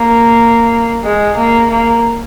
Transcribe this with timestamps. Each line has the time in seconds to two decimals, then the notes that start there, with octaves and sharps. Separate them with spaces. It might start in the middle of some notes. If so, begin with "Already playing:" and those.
Already playing: A#3
1.04 G#3
1.37 A#3
1.70 A#3